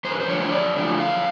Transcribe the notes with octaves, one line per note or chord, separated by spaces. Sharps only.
F#2 C5
B4
C5
D3 F3 A3 C#5
C#5
F#2 D5
D3 F3 A3
F#2 F5